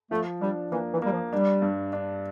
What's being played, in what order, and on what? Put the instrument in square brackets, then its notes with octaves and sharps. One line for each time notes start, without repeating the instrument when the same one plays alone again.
[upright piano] F3 [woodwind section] A3
[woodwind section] G3 [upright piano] D4
[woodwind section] E3 [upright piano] A#3
[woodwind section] E3
[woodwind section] G3 [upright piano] A#3
[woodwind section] F3
[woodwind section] G3 [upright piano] D4
[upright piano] G2
D4